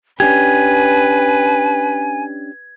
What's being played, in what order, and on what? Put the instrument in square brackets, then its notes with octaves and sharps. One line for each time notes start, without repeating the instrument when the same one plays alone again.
[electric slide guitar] C#4 D4 G4 [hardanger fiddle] B4 [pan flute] G#5 [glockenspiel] G#6